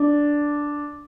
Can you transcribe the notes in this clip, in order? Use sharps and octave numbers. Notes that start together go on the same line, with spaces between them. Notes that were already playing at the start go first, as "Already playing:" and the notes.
Already playing: D4